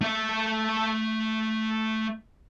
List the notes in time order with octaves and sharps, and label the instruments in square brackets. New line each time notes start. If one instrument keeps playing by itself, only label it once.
[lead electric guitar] A3 E5